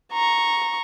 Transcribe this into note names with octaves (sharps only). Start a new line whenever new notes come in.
A#5 C#6